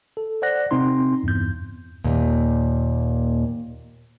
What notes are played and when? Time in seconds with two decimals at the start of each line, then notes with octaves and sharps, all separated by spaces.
0.17 A4
0.42 C5 D5 F#5 F#6 A#6
0.71 C3 C4 D#4 C6
1.24 E2 G2 G6
2.04 D#2 A#2